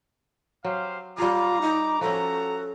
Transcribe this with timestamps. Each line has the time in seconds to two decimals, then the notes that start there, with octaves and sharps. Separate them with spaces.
0.64 F#3 G4 C5 F5
1.18 G3 F4 G#4 A#5 D6
1.62 D#4
2.01 F3 C#4 F#4 A4 A#5